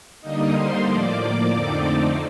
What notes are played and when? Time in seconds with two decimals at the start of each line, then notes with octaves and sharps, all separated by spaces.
0.21 D3 G3 A#3 D#4 D#5 D#6
0.54 C5 C6
0.86 A2 F3 A#3 D5 D6
1.52 F2 D3 A3 C4 D#4